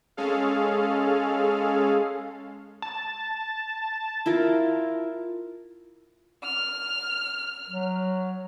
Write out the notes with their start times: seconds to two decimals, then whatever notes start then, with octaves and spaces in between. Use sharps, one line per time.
0.17 G#3 C#4 G#4 A4 F5
2.82 A5
4.26 E4 F4 A#4
6.44 F6
7.70 F#3